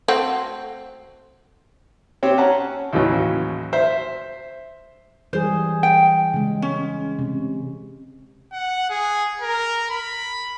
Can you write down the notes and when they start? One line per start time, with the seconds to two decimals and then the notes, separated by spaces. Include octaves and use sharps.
0.08 A3 C4 F#4
2.23 C4 G4 C#5
2.38 C#4 F#5 A5 A#5
2.93 D#2 A2 C#3 E3 F#3
3.73 C5 E5
5.33 E3 G3 G#4 C5
5.83 G5
6.34 C#3 G#3
6.62 C#4
7.19 C3
8.52 F#5
8.90 G#4
9.41 A#4
9.90 B5